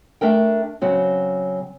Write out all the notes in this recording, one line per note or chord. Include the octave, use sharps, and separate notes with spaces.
A3 D4 A#4 G5
C#3 F#3 C4 F#4